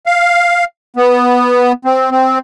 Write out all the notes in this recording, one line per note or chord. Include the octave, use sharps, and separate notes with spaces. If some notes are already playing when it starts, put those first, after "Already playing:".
F5
B3
C4
C4